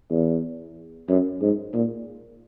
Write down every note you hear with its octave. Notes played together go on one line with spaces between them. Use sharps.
E2
F#2
G#2
A#2